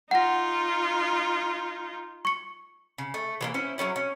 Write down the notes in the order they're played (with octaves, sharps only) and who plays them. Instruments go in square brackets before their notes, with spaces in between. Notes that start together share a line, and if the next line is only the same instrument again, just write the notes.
[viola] D#4 F4 [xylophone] F#5 A#6
[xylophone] C#6 C#7
[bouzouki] C#3
A3
E3 G#3 A#3
C#4 E4 C5
F#3 G3 C#4 E4
C#4